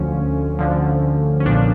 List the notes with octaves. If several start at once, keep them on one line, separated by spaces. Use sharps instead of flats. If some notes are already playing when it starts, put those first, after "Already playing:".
Already playing: D2 D3 F3 C#4
D2 D3 F3
C#4
B1 A#2 F3 D4